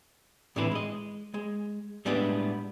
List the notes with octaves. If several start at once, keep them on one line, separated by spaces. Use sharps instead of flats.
A2 D3 E3 C4 E4 B4
G#3 D#5
G#3
A2 G3 G#3 B3 D4